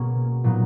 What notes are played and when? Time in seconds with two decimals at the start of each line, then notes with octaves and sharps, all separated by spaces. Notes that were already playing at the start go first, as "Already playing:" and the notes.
Already playing: B2 A#3 C#4 G#4
0.44 A#2 F#3 B3 D#4